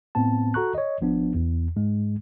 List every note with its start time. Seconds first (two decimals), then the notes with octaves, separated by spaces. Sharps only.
0.15 A2 B3 C4 A5
0.54 F#4 A4 A#5 C#6 F#6
0.75 C#5 D#5
1.01 G#1 F3 B3 D4
1.35 E2
1.76 G#2 G#3